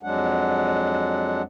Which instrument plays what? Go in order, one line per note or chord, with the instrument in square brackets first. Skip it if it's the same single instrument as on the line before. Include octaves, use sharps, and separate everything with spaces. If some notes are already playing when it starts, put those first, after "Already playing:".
[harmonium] F2 F#3 G#3 D4 F#5